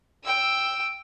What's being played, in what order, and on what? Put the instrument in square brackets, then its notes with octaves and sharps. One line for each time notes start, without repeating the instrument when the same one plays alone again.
[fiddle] G5 E6